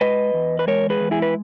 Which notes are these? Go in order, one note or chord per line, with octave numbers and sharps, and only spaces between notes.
G#3 B4 D#5
E2
B4
G#3 A#4 C#5
G#4 B4
E2
E4 G#4
B4